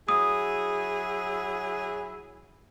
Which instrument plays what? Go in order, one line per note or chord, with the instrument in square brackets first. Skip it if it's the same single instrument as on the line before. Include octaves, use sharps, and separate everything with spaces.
[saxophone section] F#3 E4 G#4 [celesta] D#6